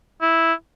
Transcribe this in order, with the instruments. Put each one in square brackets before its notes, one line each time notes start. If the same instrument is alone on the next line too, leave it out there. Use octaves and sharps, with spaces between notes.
[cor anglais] E4